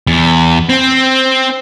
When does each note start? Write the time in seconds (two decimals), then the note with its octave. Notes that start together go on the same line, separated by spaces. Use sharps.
0.07 E2
0.69 C4